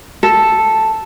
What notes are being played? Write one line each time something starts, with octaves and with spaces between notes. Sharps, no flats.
A4